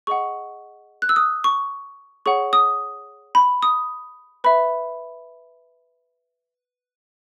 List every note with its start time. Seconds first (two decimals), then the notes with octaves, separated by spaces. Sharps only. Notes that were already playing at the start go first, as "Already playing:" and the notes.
0.07 G#4 D#5 F#5 C#6
1.02 F#6
1.09 E6
1.16 D#6
1.44 C#6
2.26 G#4 C#5 F#5 C#6
2.53 D#6
3.35 B5
3.63 D#6
4.44 B4 E5 B5